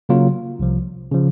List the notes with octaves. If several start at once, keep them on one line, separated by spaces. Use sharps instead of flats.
C#3 F#3 A#3 F4
C2 C3 F3
C#3 F3